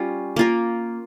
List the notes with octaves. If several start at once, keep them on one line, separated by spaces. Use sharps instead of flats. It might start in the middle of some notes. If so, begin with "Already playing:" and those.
Already playing: G3 C#4 F4
A#3 F4 A#4